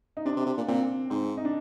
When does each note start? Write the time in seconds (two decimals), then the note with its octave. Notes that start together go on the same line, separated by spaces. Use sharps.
0.17 D#4
0.25 C3 D4
0.36 C3
0.46 C3
0.57 A#2
0.68 A#2 C4
1.10 G#2 C4
1.37 D#4
1.45 D4